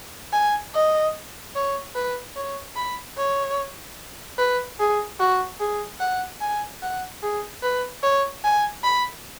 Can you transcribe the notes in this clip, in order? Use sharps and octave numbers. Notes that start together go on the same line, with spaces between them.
G#5
D#5
C#5
B4
C#5
B5
C#5
B4
G#4
F#4
G#4
F#5
G#5
F#5
G#4
B4
C#5
G#5
B5